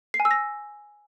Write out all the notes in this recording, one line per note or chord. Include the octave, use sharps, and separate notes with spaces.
C7
G#5
E6
A#6